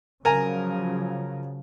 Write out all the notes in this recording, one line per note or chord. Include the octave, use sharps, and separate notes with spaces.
C#3 F3 F#3 A#4 G#5 A#5